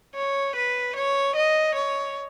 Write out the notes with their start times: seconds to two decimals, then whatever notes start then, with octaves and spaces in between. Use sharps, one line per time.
0.15 C#5
0.55 B4
0.96 C#5
1.35 D#5
1.75 C#5